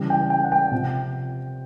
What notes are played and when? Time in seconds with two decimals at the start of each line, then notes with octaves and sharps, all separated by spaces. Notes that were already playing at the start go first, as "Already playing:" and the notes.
Already playing: C#3 E3 G3
0.10 G5
0.30 G5
0.44 F#5
0.52 G5
0.71 C3 F3